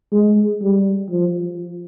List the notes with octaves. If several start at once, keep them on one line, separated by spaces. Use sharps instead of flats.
G#3
G3
F3